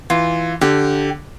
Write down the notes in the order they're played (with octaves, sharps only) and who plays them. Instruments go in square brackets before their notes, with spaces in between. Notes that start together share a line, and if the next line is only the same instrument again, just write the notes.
[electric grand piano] E3 [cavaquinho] F4
[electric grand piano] D3 [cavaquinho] G4